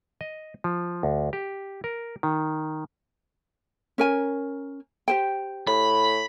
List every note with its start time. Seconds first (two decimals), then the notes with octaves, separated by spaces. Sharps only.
0.21 D#5
0.64 F3
1.03 D2
1.33 G4
1.84 A#4
2.23 D#3
3.98 C#4 A#4 G#5
5.08 G4 C5 G5
5.67 A2 B5